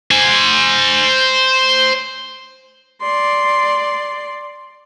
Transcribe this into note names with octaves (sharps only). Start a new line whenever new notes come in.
C5 G#5
D5 C6